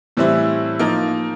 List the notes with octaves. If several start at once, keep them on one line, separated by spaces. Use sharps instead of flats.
A2 E3 G3 C4 E4
F3 A#3 D#4